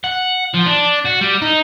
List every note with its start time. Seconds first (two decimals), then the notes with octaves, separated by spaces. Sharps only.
0.04 F#5
0.54 F3
0.67 D4
1.05 F#4
1.21 G3
1.42 D#4